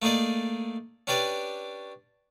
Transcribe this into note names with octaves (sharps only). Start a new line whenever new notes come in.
A3 A#3 D#4 G#4 D5
C#4 D4 G4 B4 D5